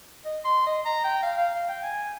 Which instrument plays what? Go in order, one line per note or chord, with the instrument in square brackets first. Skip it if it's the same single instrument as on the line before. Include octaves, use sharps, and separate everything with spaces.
[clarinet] D#5
C6
D#5
A#5
G5
F5
F5
G5
G#5